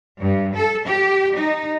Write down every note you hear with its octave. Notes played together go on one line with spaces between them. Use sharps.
G2
A4
G4
D#4